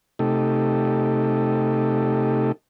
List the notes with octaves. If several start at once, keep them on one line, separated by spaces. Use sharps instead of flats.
C3 A3 D#4 G4 A4